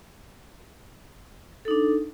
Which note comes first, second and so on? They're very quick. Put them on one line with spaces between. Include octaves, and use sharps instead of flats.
A4 D#4 D4